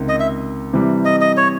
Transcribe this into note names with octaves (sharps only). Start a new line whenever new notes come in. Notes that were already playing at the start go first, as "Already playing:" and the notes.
Already playing: C#2 C3 D#3
D#5
E5
C3 E3 G3
D#5
D#5
C#5